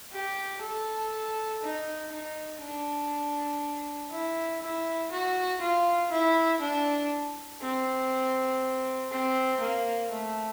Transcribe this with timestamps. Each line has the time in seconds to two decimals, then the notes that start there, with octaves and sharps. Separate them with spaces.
0.13 G4
0.62 A4
1.62 D#4
2.12 D#4
2.62 D4
4.11 E4
4.62 E4
5.11 F#4
5.61 F4
6.11 E4
6.61 D4
7.62 C4
9.11 C4
9.61 A#3
10.11 A3